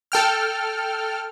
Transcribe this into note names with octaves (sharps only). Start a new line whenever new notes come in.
A4 G5 F6